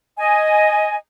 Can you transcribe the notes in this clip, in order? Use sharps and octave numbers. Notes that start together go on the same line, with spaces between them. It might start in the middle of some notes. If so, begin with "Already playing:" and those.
D#5 G#5